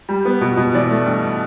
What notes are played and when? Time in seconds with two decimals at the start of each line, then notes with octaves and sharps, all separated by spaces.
0.09 G3
0.25 B3
0.41 B2
0.57 B2
0.74 E3 D5
0.90 A3
1.06 G2